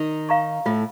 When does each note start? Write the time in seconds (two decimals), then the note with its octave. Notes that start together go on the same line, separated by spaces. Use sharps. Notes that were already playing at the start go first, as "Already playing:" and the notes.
Already playing: D#3 D#4
0.29 F5 A#5 C#6
0.66 A2 A3 F4